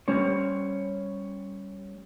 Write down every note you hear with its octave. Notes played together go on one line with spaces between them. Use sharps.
G3 C#4 C5 C#5